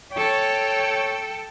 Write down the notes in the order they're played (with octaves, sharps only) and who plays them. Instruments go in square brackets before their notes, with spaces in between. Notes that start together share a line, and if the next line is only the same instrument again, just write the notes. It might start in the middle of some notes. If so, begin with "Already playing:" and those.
[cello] A4 G5 [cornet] C#5